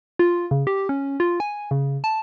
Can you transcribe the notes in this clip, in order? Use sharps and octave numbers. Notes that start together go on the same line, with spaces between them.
F4
C#3
G4
C#4
F4
G#5
C#3
A5